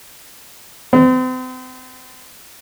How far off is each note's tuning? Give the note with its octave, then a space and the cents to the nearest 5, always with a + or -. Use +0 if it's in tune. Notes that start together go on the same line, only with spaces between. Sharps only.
C4 -40